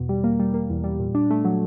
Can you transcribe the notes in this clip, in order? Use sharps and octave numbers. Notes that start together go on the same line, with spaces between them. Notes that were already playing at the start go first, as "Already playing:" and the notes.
Already playing: E2 B2
G3
A#3
G3
A#3
E2
G3
A#2
D4
A3
F#3